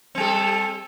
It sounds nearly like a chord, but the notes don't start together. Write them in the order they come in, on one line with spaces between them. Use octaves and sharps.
C4 G3 A4